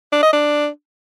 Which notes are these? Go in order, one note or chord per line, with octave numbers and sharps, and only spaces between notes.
D4
D#5
D4